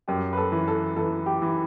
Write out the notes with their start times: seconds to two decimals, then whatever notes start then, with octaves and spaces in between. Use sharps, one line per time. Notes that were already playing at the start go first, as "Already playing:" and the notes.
0.08 F#2 G4
0.33 B4
0.37 A4
0.52 E3
0.68 A4
0.96 E3 A4
1.26 G4
1.42 E3